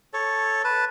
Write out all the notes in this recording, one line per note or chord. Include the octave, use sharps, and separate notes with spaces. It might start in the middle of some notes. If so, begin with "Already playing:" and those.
A4 C#5
B4 A5